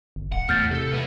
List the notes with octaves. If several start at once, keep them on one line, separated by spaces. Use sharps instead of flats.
G1
D1 F#5
E2 A2 F6 G6 A6
C3 A4
B3 E4